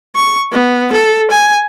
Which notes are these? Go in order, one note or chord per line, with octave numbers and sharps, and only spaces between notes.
C#6
B3
A4
G#5